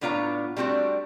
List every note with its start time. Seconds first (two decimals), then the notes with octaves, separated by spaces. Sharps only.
0.01 A2 B3 D4 F4 C#5 A#5
0.57 G3 A3 C4 D4 F#4